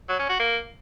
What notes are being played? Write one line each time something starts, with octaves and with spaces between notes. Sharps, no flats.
F#3
C#4
F#4
A#3